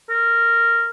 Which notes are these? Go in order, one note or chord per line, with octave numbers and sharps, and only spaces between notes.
A#4